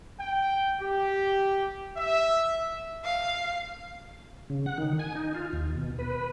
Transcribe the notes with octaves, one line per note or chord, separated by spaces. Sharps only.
G5
G4
E5
F5
C#3
F#5
D#3
G#5
D#4
F4
D#2
B2
B4